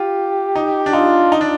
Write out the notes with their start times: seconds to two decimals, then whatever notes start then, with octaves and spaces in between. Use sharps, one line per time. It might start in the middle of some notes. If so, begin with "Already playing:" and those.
Already playing: F4 G4
0.55 D#4
0.86 D4
0.93 D#4 F4
1.32 D#4
1.41 D4